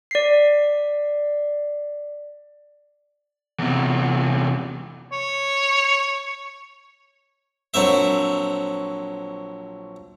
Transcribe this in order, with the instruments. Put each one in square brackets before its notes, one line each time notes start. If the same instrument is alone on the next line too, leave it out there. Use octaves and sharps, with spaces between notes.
[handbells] D5 B6 C7
[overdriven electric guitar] E2 C3
[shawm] C#5
[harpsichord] A#1 F#3 C4 E5